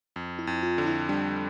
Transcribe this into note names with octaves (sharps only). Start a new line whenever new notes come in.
F2
E4
F2
F4
D3
E4
G3 D4